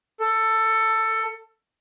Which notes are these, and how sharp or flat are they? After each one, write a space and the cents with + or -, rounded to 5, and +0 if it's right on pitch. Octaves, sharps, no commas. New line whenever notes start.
A4 +15